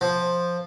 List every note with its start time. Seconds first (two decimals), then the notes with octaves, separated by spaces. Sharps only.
0.01 F3